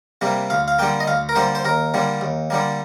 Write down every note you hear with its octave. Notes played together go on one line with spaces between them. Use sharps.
C3 G3 A#3
D2 F5
F5
D3 G3 A#3 G5
D#5
D2 F5
A#4
D3 G3 A#3 C5
C5
D#2 A#4
D3 G3 A#3
D#2
D3 G3 A#3